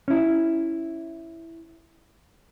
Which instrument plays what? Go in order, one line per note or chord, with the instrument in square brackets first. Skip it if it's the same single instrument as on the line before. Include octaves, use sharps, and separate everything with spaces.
[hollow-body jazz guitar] C#4 E4